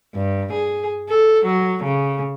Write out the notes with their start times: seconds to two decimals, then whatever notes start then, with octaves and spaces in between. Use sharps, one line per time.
0.15 G2
0.53 G#4
1.09 A4
1.46 F#3
1.84 C#3